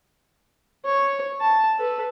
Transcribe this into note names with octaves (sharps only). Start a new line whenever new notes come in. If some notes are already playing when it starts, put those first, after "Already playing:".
C#5
A5
A4 B4